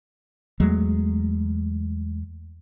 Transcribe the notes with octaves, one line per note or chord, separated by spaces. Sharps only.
E2 F#3 G#3 A3